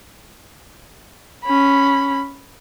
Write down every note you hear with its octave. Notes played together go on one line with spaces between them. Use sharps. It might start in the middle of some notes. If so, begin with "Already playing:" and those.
C#4 B5